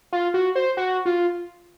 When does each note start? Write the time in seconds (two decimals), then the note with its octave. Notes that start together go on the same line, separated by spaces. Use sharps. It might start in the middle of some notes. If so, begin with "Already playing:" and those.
0.12 F4
0.34 F#4
0.55 C5
0.77 F#4
1.06 F4